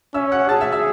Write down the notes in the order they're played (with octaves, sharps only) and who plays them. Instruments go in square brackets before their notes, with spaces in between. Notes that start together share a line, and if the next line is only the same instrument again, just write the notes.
[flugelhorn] C#4 [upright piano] E5 E6
[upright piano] F#5 F#6
[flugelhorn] G#4 [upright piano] A5 A6
[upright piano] E5 E6
E5 E6